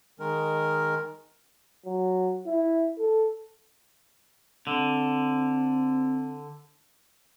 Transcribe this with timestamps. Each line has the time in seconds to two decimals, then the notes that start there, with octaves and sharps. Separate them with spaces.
0.19 D#3 G#3 A#4
1.86 F#3
2.46 E4
2.98 A4
4.67 D3 C4